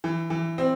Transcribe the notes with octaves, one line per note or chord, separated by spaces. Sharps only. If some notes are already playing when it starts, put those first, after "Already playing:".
E3
E3
C4